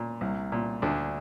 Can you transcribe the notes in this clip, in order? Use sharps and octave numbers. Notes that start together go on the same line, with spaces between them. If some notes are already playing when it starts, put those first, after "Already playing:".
Already playing: A#2
C2
A#2
D2 D4